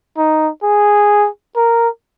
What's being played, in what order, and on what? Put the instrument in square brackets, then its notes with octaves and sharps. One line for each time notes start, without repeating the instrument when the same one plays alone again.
[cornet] D#4
G#4
A#4